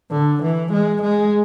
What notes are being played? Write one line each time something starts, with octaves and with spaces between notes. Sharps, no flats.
D3
E3
G#3
G#3